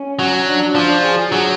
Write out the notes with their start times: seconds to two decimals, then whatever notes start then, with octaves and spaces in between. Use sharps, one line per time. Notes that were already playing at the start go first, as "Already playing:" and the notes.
Already playing: C#4
0.19 F#3
0.47 D4
0.75 F3
1.04 G#4
1.32 F#3